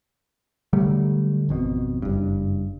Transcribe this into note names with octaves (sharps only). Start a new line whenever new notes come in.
D3 F#3 G3 A3
G#1 F2 B2
F#1 G2